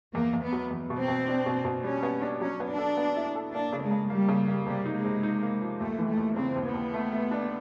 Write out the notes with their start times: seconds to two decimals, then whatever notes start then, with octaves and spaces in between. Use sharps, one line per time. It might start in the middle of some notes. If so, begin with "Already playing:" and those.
0.14 E2 A#3
0.34 E2
0.43 B3
0.52 F#3
0.71 E2
0.90 B2
1.00 C4
1.08 B2
1.27 D4
1.46 B2
1.65 B2
1.84 G3 C#4
2.03 B3
2.22 D4
2.41 F#3 C#4
2.60 B3
2.68 D4
2.78 A4
2.97 B3
3.16 E4
3.35 A4
3.54 A#3 D4
3.73 C#3
3.82 G#3
3.91 C#3
4.10 G3 A#3
4.29 C#3
4.48 A#3
4.66 C3 G3
4.85 D#4
4.96 G#3
5.05 C3
5.23 D#4
5.43 A#3
5.61 F3
5.80 D#2 A3
5.98 E3
6.08 A3
6.17 D#2
6.36 C#3 C4
6.56 D#2
6.64 B3
6.74 D#2
6.94 A3
7.12 A3
7.31 D4